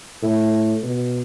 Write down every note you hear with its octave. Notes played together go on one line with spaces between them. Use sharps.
A2
B2